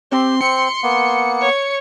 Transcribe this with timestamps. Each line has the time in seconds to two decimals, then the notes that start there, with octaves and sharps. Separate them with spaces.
0.12 C4 G4 C6
0.41 C4 C#7
0.83 A#3 B3
1.41 C#5